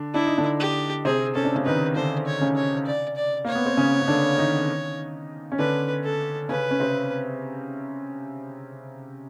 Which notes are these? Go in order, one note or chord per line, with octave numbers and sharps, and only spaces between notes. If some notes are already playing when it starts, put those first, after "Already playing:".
Already playing: D3 D4
D4 E4
D#4
D3 D4
G4
C3 C4 G#4
C#4 A4
D4
C#3 C#4
D#3 D#4 B4
D3 D4 C5
C#5
C#3 C#4
C#5
D5
D5
A#3 C#5
B3
C4
C#3 C#4
C#4
D3 D4
D#3 D#4
C#4
D3 D4 B4
A4
C#3 C#4 B4
C#4
C3 C4